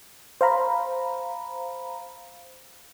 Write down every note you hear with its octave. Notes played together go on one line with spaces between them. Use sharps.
C5 F5 A#5 B5